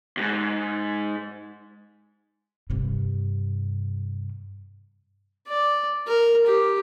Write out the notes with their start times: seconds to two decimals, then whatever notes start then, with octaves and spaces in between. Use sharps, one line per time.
0.17 D#2 G#2
2.70 G2 C3
5.48 D5
6.07 A#4
6.46 G4